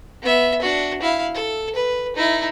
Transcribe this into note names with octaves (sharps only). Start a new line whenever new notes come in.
B3 E5
D4 F#4
E4 F5
A4
B4
D#4 E4